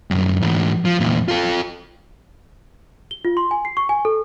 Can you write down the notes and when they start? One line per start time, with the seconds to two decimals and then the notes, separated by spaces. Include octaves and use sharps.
0.11 C2 F#2
0.41 G#2 E3
0.85 F3
1.00 E2 A#2
1.28 F4 A4
3.11 G7
3.25 F4
3.37 C6
3.51 G#5
3.65 C7
3.77 C#6
3.89 G#5
4.05 A4